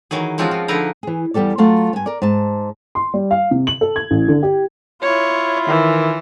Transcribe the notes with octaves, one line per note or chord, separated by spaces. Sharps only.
D#3 E3 F#3 G#4
F3 G#3 C4 C#4 F4 F#4
F3
D3 F3 D#4 E4 B4 A#5
E3 G#4
E2 G3 G4 A4 D5
F#3 A3 F4 F5 A5
G2 G#5
A#4 D5
G#2 A5
C6
G3
F5
C3
F#7
A4
G#6
A1
D3
G4
E4 F4 C#5
D#3 E3